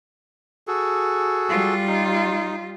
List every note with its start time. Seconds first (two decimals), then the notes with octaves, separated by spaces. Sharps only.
0.67 F#4 G#4 A4
1.49 G3 F4
1.87 D#4